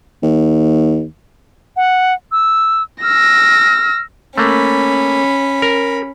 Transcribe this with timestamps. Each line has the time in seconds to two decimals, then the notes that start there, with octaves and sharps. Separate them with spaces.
0.23 D#2
1.76 F#5
2.32 E6
3.03 E6 F6 A#6
4.38 A3 A#3 C#4 B5
5.62 A#4